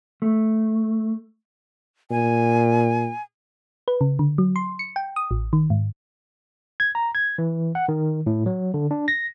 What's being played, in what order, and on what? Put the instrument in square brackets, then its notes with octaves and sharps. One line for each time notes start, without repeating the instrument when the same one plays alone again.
[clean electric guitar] A3
[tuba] A#2 [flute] G#5
[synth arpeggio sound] B4
C#3
D3
F#3
C6
C#7
G5
D#6
A1
D#3
G#2
[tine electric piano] G#6
A#5
G#6
E3
F#5
D#3
A2
F#3
D3
D4
A#6